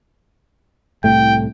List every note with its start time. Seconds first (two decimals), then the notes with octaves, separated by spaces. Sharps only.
1.04 C2 A2 A3 G5